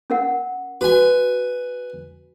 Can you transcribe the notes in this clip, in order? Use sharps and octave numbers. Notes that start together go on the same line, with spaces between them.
C#4 A#4 F#5
F#4 B4 G#5